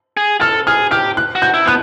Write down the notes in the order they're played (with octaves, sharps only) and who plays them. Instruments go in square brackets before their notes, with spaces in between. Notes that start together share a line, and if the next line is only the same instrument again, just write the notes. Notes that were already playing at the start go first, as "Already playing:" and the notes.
[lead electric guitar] G#4
[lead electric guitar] A4 [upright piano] F6
[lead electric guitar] G#4 [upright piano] F6
[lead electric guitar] G4 [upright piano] F6
[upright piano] F#6
[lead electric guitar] F#4
[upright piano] G6
[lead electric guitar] E4
[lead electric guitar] B3 [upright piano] F#6